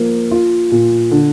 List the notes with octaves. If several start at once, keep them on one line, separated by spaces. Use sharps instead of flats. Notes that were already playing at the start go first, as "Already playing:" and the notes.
Already playing: F3 A#3
F4
A#2
D3